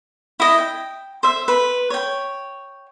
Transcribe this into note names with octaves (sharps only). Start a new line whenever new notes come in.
E4 D#5
G5
C5 E5
B4
C#5 G5